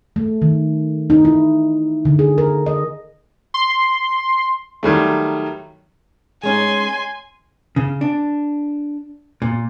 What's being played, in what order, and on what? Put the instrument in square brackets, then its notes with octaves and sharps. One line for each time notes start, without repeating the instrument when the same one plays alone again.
[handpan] A3
D#3
D#4
E4
D3
G#4
A#4
D#5
[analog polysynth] C6
[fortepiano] D#3 F#3 G3 A3
[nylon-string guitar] G#3 C#4 D#4 [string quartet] G#5 C6
[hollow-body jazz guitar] C#3
D4
A#2